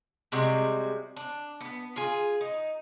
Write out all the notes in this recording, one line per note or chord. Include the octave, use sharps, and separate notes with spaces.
C3 G3 G#3 F#4
D4
B3
F4 G#4
D#4